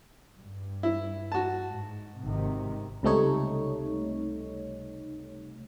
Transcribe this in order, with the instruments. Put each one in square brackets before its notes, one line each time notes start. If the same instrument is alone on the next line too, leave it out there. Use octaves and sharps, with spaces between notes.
[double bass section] G2
[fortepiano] E4
F#4 A5
[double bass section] G#2
G#1 C3 D#3
[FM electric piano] C#2 C3 G3 A3 D#4 C#5